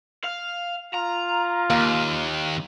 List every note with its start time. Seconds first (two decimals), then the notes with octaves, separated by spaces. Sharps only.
0.24 F5
0.94 F4 A#5
1.70 D#2 A#3